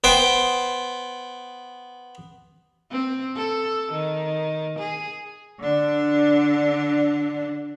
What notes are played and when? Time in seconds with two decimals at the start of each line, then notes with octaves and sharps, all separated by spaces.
0.04 B3 C5 G5
2.90 C4
3.36 A4
3.92 D#3
4.79 G#4
5.61 D3 D4